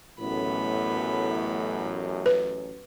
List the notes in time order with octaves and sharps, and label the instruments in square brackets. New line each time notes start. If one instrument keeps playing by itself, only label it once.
[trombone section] A1 F#2 [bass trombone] A2 [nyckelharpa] B3 B5
[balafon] B4